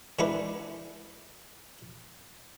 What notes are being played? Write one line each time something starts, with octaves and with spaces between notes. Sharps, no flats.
D3 G#3 D4 E4 A#4 B4